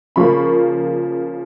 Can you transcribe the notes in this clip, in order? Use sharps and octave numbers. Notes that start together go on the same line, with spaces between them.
C#3 F3 A#3 B5 C#6